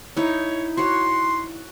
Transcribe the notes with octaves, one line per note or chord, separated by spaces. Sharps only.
D#4 E4 C#5
F#4 C#5 C6